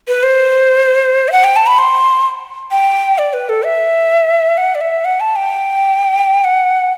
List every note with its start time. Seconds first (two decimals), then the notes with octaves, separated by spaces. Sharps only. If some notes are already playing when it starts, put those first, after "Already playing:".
0.08 B4
0.23 C5
1.28 E5
1.32 F#5
1.44 G5
1.56 A5
1.67 B5
1.78 C6
2.71 G5
3.18 D5
3.33 B4
3.49 A4
3.65 E5
4.57 F#5
4.75 D5
4.81 E5
5.05 F#5
5.20 A5
5.36 G5
6.44 F#5